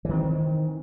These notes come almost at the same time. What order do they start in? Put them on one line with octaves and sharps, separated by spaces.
E3 D#3 C4